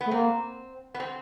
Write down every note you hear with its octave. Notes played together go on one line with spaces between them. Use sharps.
A3 B3
A#3 C4
B3
C4